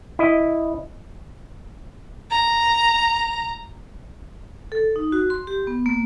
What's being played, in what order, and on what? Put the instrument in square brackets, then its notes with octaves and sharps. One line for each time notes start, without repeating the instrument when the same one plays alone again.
[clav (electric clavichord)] E4 D#5
[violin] A#5
[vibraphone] A4
D#4
F#4
C6
G4
B3
A#3